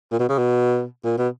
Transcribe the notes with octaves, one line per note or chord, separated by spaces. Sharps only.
A#2
B2
C#3
B2
A#2
B2